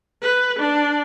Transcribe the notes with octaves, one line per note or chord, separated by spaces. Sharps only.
B4
D4